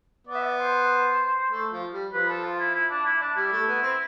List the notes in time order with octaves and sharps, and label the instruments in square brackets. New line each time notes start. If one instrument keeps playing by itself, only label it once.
[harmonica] B3 [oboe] D5
[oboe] E5
D5
C5
[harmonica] A3
F3
G3
[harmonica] F3 [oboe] B4
[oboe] A4
F4
E4
E4
D4
E4
D4
[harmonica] G3 [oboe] E4
[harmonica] A3
B3
C4